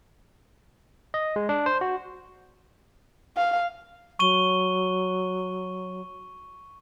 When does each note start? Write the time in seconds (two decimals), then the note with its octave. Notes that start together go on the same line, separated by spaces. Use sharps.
1.14 D#5
1.36 G#3
1.49 D4
1.66 C5
1.81 F#4
3.37 F5
4.19 F#3 C#6 D#7 G7